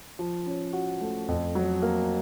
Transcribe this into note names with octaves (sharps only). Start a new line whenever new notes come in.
F3
C#4
F#4
A3
F2
F#3
A#3